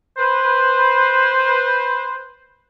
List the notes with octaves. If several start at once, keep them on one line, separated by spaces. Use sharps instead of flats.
B4 C5